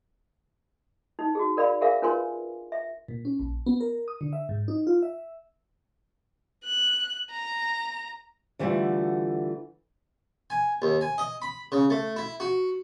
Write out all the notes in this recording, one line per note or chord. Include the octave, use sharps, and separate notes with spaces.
D#4
F#4 G#4
A#4 D5 F5 B5
G#4 A#4 E5 F5 G#5
D4 F4 A#4 B4 G#5 C6
E5
A#2
C#4
A#1
B3
A#4
D#6
D3
E5
G#2
D#4
F4
E5
F#6
A#5
D3 E3 G3 A3 F4 F#4
G#5
D#2
G#5
D#5
B5
C#3
A3
E4
F#4